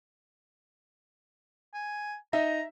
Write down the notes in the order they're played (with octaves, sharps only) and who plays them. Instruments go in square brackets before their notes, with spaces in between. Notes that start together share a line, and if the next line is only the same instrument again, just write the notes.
[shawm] G#5
[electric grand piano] D#4 D#5 [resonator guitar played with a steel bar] E5 [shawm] A#5